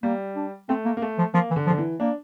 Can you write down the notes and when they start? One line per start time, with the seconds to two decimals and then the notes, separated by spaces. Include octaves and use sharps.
0.03 G3 A#3
0.36 D4
0.69 A3 C4
0.85 A#3
0.97 A#3
1.02 A3
1.18 F3
1.34 F3 A#3
1.50 E3
1.56 D3
1.67 F3
1.70 D3
1.78 E3
2.00 A#3 D4